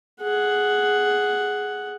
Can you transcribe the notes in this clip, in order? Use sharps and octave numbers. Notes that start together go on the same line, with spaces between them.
G#4 F#5